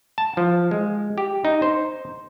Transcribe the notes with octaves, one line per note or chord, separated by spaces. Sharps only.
A5
F3
G#3
G4
D#4
C5